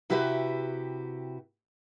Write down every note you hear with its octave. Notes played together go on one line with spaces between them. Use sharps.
C3 E4 F#4 G4 B4 E5